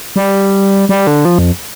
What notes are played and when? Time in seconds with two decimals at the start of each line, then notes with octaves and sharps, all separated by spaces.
0.16 G3
0.89 G3
1.07 D3
1.25 F3
1.39 F2